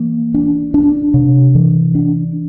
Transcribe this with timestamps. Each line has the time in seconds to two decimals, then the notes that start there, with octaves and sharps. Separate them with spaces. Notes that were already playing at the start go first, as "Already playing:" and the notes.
Already playing: E3 A#3
0.34 D4
0.74 D4
1.14 C3
1.55 E3
1.95 D4